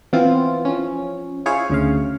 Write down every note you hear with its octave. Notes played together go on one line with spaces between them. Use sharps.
E3 B3 C4 F4
F3 C#4
E4 F4 G#4 C5 C#5 F5
D2 C#3 F5